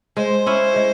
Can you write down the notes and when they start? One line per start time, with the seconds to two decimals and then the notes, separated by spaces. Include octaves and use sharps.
0.17 G#3 C5
0.46 C#4 E4
0.76 G#3